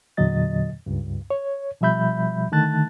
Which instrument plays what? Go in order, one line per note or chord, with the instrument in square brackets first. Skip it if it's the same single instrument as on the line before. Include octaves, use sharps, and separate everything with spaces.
[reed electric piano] E2 A#2 D3 F#3 D#5 A6
C#2 G2
C#5
B2 F3 G3 E5 B5 G6
D3 D#3 A3 A5 F#6 A6